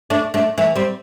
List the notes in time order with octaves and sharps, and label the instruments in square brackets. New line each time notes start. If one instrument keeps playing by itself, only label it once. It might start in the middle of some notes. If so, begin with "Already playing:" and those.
[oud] A3 D4
A3 D4
E3 A3
G3 C4